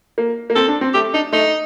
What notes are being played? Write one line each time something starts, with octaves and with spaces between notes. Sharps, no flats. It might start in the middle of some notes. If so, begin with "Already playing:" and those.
A#3
A#3
C4 A4
D4
C4
A3 G4
D4 D#4
A3 D#4